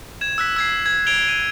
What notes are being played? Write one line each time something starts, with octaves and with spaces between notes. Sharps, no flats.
G#6 E7
E6 F#6 B6
E6 G#6 C7
G#6
G#6 D7 F7 G7
D#7